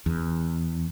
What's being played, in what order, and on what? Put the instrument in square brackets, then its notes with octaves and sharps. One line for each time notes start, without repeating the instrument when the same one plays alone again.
[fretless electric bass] E2